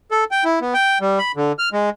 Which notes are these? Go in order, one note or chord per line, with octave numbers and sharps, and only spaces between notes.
A4
G5
E4
B3
G5
G3
B5
D3
F6
G#3